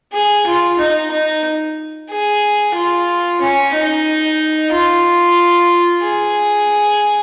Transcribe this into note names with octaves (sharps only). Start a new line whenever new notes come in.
G#4
F4
D#4
D#4
G#4
F4
C#4
D#4
F4
G#4